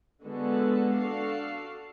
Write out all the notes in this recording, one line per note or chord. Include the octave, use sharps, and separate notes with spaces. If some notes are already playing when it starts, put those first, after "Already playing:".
D3 G#3 B3 F#4 A4
D4 F#4 A4 F5